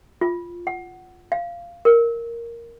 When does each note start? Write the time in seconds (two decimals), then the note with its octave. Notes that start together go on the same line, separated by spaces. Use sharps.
0.21 F4
0.67 F#5
1.32 F5
1.85 A#4